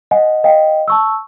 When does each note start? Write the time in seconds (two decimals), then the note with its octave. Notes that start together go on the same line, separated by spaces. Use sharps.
0.11 D#5 F#5 G#5
0.44 D#5 F5 G5
0.88 A5 C#6 E6